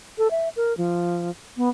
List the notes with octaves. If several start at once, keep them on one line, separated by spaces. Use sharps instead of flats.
A4
E5
A#4
F3
B3